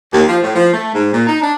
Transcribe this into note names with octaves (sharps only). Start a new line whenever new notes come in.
D#2
F3
A2
F3
A3
G#2
A#2
D#4
D4